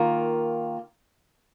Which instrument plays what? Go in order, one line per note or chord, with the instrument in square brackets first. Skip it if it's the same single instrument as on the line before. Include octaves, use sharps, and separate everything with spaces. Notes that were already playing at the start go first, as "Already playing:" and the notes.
Already playing: [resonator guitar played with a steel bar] D#3 A#3 F4